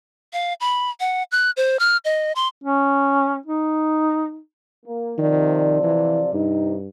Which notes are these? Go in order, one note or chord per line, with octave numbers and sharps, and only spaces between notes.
F5
B5
F#5
F#6
C5
F6
D#5
C6
C#4
D#4
A#3
C3 D#3 F3 D5
E3
G2 C3 D#4